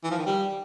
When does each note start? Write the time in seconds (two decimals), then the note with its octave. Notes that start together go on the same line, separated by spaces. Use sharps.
0.04 E3
0.11 F3
0.19 D#3
0.26 G3